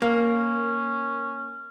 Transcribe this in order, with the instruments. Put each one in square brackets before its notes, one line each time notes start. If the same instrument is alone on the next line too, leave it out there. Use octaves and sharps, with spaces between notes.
[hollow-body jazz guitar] A#3 [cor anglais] C#4